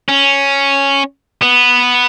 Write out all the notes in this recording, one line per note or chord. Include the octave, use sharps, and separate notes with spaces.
C#4
B3